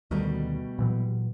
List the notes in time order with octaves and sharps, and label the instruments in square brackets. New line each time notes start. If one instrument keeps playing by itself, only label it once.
[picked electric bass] D2 D#3 [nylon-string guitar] B2 G3 A3
[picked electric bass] A#2 E3 F#3